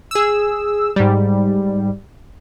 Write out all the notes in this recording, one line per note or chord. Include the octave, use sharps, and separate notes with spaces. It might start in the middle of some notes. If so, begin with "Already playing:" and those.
G#4 E6
G#2 G3